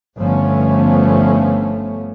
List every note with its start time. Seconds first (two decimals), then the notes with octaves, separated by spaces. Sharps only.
0.18 G1 D3 F3 A3 B3 C#4